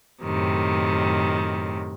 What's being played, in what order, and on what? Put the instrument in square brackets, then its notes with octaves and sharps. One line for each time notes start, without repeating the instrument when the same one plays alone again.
[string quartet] F#2 A2 C3 D#3